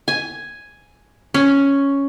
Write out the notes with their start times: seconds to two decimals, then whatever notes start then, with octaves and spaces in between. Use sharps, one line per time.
0.08 G#5
1.34 C#4